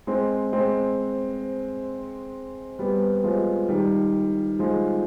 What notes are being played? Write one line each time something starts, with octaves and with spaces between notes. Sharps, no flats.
G#3 C4
G#3 C4
G3 B3
F3 G#3
D#3 G3
F3 G#3